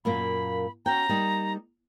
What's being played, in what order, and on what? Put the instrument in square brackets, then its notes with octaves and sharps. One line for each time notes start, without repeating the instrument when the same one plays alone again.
[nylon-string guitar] F#2 A#2 A#3 [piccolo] B5
[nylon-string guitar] C#4 F#4 G5 [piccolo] A#5
[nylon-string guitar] G3 A#3 D#4